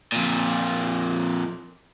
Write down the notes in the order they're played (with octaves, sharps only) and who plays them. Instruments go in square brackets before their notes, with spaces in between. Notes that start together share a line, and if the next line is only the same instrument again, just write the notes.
[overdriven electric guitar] F2 A#2